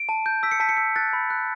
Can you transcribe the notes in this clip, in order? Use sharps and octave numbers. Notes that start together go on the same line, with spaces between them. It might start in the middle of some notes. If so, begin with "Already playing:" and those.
Already playing: D7
A5
G6
E6 B6
C#7
A5 B6
C#7
E6 B6
F#6 A6
B5
F#6